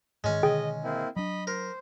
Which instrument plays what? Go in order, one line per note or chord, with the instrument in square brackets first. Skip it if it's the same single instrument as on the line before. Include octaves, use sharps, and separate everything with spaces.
[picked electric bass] G#2 D#3 [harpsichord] G#3 C#4
[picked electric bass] B2 D3 D#3 [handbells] G#4 G5 [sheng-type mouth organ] D#5
[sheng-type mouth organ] A#3 C4 E4
[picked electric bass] F#3 D4 [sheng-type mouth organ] D#5 B5
[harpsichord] A#4 [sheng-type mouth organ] C5